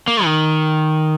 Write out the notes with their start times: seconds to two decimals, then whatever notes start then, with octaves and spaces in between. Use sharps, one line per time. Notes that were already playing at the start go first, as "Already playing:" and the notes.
0.07 A#3
0.24 D#3